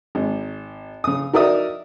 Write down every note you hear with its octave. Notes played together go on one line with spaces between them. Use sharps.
G#1
C#3 D#6
D#4 F#4 A#4 D5 E5 D#6